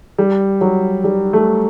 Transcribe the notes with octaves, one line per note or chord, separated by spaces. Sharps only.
G3
F#3
G3
A3